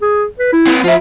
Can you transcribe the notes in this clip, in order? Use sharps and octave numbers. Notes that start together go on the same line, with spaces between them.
G#4
B4
E4
C4 B4
F3 F4 E5